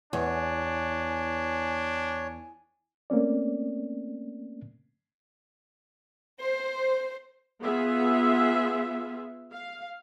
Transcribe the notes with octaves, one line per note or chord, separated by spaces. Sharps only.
E2 D4 C#5 G#5
A3 A#3 C4 C#4 D5
C5
B3 F4 G#4 E5
F5